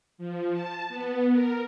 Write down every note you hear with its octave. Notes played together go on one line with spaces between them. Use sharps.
F3
A5
B3
A#4